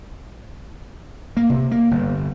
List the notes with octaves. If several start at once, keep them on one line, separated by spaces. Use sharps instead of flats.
A#3
C3
A#3
G1